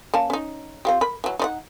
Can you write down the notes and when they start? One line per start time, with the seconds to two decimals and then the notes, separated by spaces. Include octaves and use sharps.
0.14 A#3 C#4 A5
0.30 C#4 D#4
0.85 C4 F4 G4
1.01 A#4 B5
1.24 E3 F#3
1.39 D#4 D5 F#5